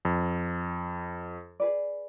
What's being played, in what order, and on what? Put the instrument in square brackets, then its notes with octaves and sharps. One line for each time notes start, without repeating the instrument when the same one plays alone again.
[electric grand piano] F2
[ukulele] G#4 B4 D5